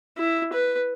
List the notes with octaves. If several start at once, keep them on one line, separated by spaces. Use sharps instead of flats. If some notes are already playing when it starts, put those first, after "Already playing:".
E4
B4